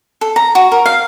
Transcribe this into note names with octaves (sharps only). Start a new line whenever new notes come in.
A4
A#5
F#4
A#4
F5